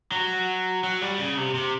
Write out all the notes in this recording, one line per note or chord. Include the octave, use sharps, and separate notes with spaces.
F#3
F#3
G3
C#3
C3
C3